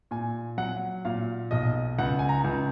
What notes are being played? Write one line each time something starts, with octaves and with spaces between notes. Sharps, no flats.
A#2 G#5
F#3 F#5
A#2 F5
B1 D#5
C#2 F#5
G#5
A#5
C#2